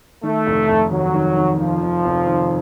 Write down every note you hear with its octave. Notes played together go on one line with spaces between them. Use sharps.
D#3 A3
F1
F1
D#2 F#3
D#3
D#3
D#3 F3
D#3
F1
D#3